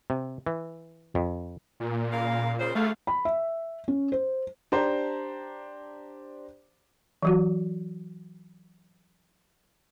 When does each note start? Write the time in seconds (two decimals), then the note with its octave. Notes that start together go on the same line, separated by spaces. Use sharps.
0.10 C3
0.46 E3
1.15 F2
1.80 A#2
2.12 C#3 A#4 F5
2.59 C#3 C5
2.75 D2 A3 G#4 F5
3.07 B5
3.25 E5
3.88 C#4
4.12 C5
4.72 D4 G4 C5 D5 A#5
7.23 E3 F#3 F#4